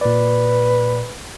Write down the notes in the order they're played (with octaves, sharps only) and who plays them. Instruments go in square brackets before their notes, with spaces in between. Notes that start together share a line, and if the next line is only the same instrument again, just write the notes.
[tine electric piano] A#2 D5 [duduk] B4